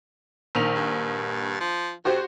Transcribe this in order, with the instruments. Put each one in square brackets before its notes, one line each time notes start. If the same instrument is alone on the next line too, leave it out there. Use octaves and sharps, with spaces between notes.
[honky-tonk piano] A#1 D#3 F7
[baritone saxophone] G2
F3
[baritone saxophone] F2 [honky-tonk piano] F#4 G4 C5